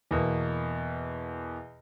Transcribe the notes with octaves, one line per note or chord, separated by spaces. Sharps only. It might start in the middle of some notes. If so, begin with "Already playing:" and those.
E2 B2 A#3